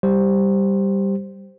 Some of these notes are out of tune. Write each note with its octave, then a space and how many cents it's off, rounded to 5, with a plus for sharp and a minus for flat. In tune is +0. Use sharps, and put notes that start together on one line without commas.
G3 +0 G4 +0 C5 +0